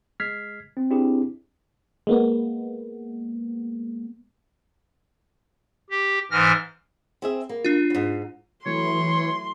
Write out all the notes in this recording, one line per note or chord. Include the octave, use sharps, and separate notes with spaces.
G#3 F6 G#6 B6 C7
C4
C4 D4 E4 G4 G#4
G#3 A#3 B3
G4
G#2 E3 F6 A#6
C4 G#4 E5
A#3
D4 F4
F2 G#2
E3 F#3 A3 E4 C#5 C6